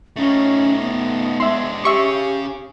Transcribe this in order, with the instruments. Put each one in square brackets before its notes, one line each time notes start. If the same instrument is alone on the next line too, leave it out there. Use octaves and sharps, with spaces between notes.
[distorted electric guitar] A3 D#4 [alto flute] C#4
[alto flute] B3
[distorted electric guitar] G#3 D4 [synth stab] E5 C6
[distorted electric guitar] C#4 G#4 [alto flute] G4 [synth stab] E5 C#6 D6